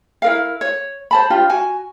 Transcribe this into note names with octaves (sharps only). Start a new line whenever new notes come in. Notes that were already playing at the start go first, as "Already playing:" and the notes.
E4 A#4 F5
C#5
C5 A5 B5
D4 F4 G4
F#4 G#5